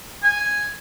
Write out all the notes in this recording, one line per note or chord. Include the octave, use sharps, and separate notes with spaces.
G#5